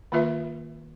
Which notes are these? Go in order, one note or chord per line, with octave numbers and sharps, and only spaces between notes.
D#3 A#3 F4 B4 E5